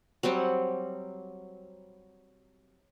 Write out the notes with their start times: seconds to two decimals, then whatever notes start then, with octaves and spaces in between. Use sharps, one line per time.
0.23 F#3 G3 C4 F#5